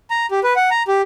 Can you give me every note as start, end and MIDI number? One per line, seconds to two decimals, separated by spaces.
0.11 0.26 82
0.31 0.40 67
0.44 0.53 71
0.56 0.69 78
0.71 0.83 82
0.88 1.02 67